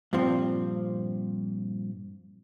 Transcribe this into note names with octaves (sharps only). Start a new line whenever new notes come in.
G2 A#2 F3 C4